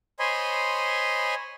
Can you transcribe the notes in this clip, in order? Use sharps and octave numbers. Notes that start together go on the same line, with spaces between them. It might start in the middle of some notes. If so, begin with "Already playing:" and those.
C5 C#5 D#5 G#5 B5 C6